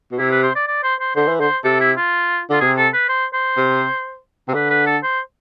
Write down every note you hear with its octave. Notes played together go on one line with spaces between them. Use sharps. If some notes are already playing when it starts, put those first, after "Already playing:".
B2
C3 E4
B4
C5
D5
D5
C5
C5
D3 C5
E3
D3 C5
C3 A4
E4
F4
D3 F4
C3 G#4
A4
B4
C5
C5
C3
C3
D3 B4
B4
A4
C5